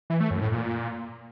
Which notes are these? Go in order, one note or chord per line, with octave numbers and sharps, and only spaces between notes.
E3
A3
F#2
A2
A#2